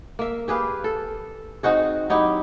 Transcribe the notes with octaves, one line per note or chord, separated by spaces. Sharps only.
A#3 E5
G4 G#4 B4 F5
A4
C4 D#4 F#4 G#4
F#3 D#4 E4 G4